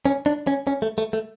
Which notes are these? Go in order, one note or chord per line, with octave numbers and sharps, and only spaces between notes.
C#4
D4
C#4
C#4
A3
A3
A3